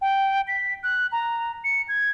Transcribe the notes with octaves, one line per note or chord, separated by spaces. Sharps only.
G5
B6
F#6
A#5
C#7
G#6